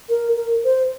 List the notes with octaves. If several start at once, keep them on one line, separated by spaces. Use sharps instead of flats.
A#4
A#4
C5